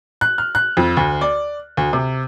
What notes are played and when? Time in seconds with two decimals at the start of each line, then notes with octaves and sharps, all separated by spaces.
0.21 F#6
0.38 F6
0.55 F#6
0.77 F2
0.97 D2
1.21 D5
1.77 D2
1.93 C3